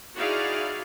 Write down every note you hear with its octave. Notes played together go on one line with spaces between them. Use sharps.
D#4 E4 F#4 G#4 D5 F5